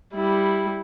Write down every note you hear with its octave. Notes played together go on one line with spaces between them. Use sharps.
G3 E4